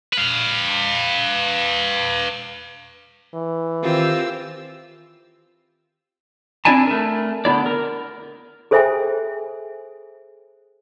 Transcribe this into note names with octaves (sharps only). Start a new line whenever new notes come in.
B4 F5
E3
D#3 C4 F4 G4 E6
C4 D4 E4 D5 G#5 A5
A3 A#4
D3 B3 E4 D5
A#4
G#4 A4 C5 E5 G5 G#5